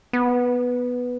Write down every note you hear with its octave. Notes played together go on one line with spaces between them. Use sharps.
B3